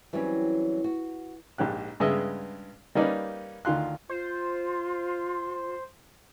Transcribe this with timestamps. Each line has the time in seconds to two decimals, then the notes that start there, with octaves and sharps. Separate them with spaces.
0.13 E3 F#3 G3 C4 C#4
0.84 F#4
1.58 A#1 G#2 G4 F#6
2.00 G2 C#3 G#3 B3 D#5 E5
2.95 G3 A#3 C#4 D#4 B4 D5
3.65 D2 D#3 F4 C6 F#6
4.09 F4 C5